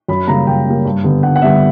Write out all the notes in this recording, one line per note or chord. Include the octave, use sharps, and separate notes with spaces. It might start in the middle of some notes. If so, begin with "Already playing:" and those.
F#2 B5
C#3 G3 A#3 A#5
F#2 G5
C#3 G3 A#3
G2
D3 G3 B3
G2 F#5
F#5
D3 G3 B3 E5